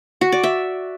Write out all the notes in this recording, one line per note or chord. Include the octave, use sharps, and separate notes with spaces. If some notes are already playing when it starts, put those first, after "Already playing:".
F#4
D5
E5